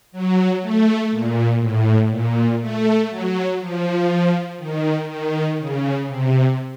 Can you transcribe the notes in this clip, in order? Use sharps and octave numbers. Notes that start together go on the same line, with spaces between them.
F#3
A3
A#2
A2
A#2
A3
F#3
F3
D#3
D#3
C#3
C3